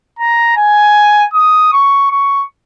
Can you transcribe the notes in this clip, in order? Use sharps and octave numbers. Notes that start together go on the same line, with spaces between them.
A#5
G#5
D#6
C#6
C#6